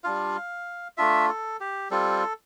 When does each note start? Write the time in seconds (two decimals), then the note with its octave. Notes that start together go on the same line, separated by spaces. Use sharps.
0.04 G3 D4 F4 F5
0.97 A3 D4 F4 E5
1.29 A4
1.60 G4
1.91 G3 C4 F4 A4